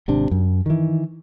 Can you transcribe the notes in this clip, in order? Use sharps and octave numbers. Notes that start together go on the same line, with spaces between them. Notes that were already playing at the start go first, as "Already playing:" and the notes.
G#1 C3 D4
F#2
D#3 E3